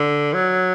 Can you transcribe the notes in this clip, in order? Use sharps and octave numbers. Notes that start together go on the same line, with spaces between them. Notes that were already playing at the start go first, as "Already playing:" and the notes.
Already playing: D3
F#3